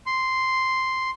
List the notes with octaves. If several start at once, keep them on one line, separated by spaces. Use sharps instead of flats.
C6